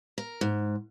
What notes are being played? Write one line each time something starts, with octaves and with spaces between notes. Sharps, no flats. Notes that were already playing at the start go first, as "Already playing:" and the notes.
A#4
G#2